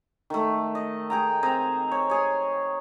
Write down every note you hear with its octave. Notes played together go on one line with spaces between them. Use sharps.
D#3 A3
D#5
G#4 G5 A#5
C4 G#4 G#5 A#5
C#5
G#4 C#5